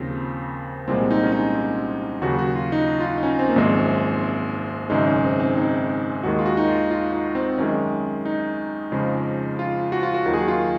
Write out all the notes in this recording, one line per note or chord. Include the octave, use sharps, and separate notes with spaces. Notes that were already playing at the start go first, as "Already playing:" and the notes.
Already playing: D#2 C#3 F3 C4
C2 A#2 F3 G#3 C4
D#4
C#4
D#4
D#2 C#3 F#3 F#4
F#4
F4
D#4
F4
D#4
D#4
C#4
C4
A#3
G#1 F#2 F3 G#3 C4
G#1 F#2 C#3 G#3 D#4
C#4
C4
C4
D#4
D#2 D#3 G#3 F#4
F4
F#4
D#4
F4
F4
D#4
C4
F#2 D#3 G#3 C#4
D#4
F2 C#3 F3 G#3
F4
F#4
F4
F#4
D#2 D#3 F#3 F#4
G#4
F#4
F4